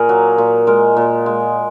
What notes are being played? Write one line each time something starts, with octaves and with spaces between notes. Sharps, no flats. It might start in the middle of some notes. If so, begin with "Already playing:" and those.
Already playing: A#2 G#4 A#4
F#3
A#2
G#3 A#4
A#2
G#3